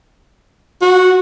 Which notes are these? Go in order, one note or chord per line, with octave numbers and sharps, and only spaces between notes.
F#4